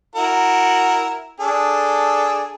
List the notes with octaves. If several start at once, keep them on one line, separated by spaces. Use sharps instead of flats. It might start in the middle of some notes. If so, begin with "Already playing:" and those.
E4 F#4 A#4
D4 G#4 A4